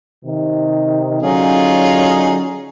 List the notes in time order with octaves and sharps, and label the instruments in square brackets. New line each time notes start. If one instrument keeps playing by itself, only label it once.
[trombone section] C3 D#3
[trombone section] D3 F#3 C#4 [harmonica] D#4 F4 G#4